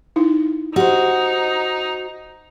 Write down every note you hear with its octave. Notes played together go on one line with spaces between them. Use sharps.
D#4 E4
D#4 F#4 G4 C5